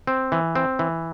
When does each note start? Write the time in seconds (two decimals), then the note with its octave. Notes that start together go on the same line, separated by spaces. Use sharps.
0.07 C4
0.32 E3
0.55 C4
0.79 E3